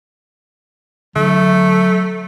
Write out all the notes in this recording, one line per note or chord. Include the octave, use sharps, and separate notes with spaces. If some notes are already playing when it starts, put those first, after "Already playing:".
D3 F#3 A3